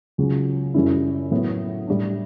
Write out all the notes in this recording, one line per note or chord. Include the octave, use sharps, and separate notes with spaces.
C#2 C#3 F#3
F#2 C#3 G3 C#4 E4
A2 F#3 B3 E4
A2 G3 D4